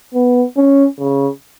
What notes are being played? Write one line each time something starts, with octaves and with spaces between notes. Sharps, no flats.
B3
C#4
C#3